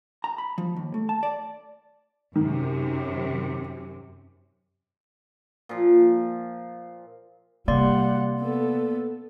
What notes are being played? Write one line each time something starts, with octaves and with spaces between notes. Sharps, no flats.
A#5
B5
F3
D#2
A3
A5
D5
F#2 C3 D#3
A#2 F3
C3 G3 A#3 D5 F#5 C6
B3 A4